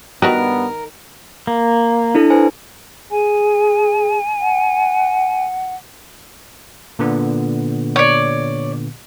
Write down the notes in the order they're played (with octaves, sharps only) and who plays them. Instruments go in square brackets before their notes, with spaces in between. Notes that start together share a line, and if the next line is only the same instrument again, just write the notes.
[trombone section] G2 B3 [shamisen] D#3 F#4 B4 [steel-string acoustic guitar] A#4
[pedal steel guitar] A#3
[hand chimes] D4 E4 A4
B4 C5 G#5
[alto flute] G#4 [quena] G#5
[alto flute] F#5
[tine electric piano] A#2 D3 B3
[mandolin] C#5 D5